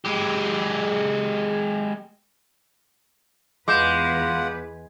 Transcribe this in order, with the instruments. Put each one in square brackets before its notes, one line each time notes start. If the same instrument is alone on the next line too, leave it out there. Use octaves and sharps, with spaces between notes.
[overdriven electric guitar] G#3 G4
[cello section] E2 B4 [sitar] G#3 [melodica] F4 F#5 [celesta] D6 G6 E7